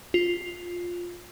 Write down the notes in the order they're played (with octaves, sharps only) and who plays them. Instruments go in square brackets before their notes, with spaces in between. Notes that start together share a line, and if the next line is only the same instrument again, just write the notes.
[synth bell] F4